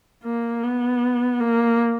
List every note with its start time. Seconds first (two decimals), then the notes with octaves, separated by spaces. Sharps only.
0.24 A#3
0.63 B3
1.40 A#3